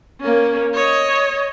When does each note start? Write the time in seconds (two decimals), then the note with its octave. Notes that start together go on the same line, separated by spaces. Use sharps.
0.21 A#3 C#4
0.74 C#5 D#5